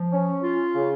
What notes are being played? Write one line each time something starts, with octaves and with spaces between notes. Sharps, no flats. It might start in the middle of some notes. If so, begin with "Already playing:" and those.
Already playing: F3
C#4
F4
C#3